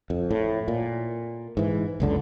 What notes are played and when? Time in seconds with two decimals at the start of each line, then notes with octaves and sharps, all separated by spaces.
0.10 F2
0.31 A2
0.68 A#2
1.57 G#2 E3
2.00 F#1 C#2 D3